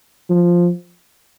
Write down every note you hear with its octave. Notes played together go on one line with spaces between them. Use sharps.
F3